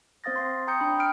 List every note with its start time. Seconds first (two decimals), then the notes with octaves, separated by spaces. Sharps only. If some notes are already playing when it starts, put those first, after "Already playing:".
0.24 C4 C5 F5 D#6 A6 A#6
0.36 C6
0.67 G5 A#5 D#6 G6 C#7
0.80 D4 G5 B5
0.99 G5 F6 D7